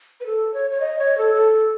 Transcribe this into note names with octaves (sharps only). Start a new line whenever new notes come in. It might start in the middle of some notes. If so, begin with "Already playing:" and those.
B4
A4
C#5
C#5
D#5
C#5
A4
A4